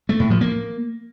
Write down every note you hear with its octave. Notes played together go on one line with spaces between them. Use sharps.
A3
A2
F3
A#3